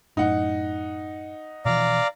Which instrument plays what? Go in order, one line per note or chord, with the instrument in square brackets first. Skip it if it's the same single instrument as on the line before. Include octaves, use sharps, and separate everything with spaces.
[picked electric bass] F#2 A2 [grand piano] D#4 F#5
[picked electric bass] B2 E3 F3 [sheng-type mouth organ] D5 F5 A#5